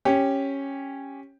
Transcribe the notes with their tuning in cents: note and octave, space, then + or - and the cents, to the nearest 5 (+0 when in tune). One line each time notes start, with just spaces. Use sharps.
C#4 -10 G4 +0